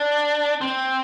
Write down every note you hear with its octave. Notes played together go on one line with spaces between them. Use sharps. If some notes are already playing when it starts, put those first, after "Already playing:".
Already playing: D4
C4